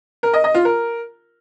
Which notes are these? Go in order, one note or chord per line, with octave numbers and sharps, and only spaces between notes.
A#4
D#5
D#5
F4
A#4